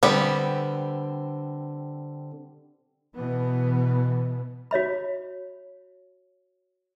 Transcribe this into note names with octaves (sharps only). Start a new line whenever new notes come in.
D3 G3 B3 C4 G4
B2 E3 B3
F#4 C#5 E5 B5